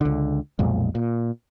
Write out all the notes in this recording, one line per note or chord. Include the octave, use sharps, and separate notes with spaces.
C#2 D3
B1 F2 A#2 G#3
A#2